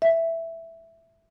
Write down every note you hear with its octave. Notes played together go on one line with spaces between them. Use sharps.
E5